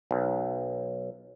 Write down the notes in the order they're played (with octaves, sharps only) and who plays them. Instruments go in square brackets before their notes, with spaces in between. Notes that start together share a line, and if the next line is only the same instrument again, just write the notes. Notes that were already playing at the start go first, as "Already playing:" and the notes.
[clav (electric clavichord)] B1